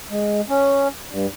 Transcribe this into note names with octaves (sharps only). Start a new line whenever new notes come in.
G#3
C#4
G2